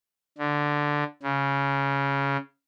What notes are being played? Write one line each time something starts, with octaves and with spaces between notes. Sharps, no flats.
D3
C#3